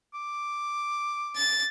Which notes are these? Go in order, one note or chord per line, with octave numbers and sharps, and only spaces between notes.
D6
A6